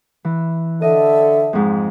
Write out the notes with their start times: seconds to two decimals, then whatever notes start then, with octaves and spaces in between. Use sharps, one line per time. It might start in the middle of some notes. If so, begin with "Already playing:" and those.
0.25 E3
0.82 D3 A4 D#5 E5
1.53 F2 G#2